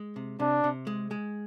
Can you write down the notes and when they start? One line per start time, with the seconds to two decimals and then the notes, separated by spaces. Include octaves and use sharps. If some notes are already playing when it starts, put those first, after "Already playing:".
Already playing: G#3
0.16 C3
0.40 C3 D4
0.64 C3
0.87 G#3
1.11 G#3